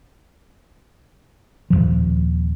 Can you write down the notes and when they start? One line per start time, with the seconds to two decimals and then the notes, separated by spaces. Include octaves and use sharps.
1.70 D#1 B1 F3